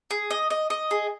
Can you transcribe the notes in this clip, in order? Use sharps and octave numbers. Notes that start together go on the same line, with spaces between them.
G#4
D#5
D#5
D#5
G#4